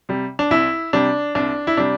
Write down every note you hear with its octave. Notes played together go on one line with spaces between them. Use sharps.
C3 G3
D4
C2 E4
C3 G3 D4
C2 D4
E4
C3 G3 D4